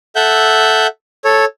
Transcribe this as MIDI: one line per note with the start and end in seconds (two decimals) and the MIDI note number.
0.16 0.87 69
0.16 0.87 76
0.16 0.87 78
0.16 0.87 91
1.25 1.45 69
1.25 1.45 73